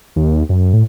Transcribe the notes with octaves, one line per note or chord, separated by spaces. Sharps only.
D#2
F#2
A2